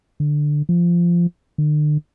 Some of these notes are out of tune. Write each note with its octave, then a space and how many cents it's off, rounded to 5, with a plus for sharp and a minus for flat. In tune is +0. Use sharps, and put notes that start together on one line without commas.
D3 +10
F3 -15
D3 +40